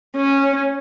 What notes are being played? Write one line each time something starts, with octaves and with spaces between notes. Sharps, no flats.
C#4